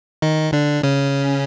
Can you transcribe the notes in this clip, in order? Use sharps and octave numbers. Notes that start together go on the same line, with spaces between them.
D#3 D#4
D3 D4
C#3 C#4